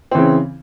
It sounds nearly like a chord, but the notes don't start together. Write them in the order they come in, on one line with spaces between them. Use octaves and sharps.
C4 E3 C#3